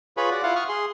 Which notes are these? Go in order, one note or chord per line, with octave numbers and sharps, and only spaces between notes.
F4 G#4 B4 C#5 B5
F#4 D5 F#5
E4 F4 F5 F#5
C#6 D#6 F6
G#4 C6